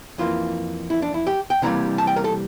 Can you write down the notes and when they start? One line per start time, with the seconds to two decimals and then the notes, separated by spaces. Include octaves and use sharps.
0.18 F2 E3 A#3 F4
0.90 E4
1.02 D4
1.14 E4
1.27 G4
1.50 G5
1.62 C3 E3 G3 A#3 A#5
1.98 A5
2.07 G5
2.16 A#4
2.24 A4